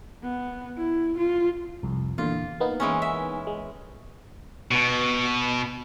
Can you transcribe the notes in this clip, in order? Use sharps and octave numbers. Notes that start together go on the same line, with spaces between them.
B3
E4
F4
C2 F2
E2 A#2 D3 F4
A#3 B3 D#4
E3 G#3 C#4
E5
G#3
B2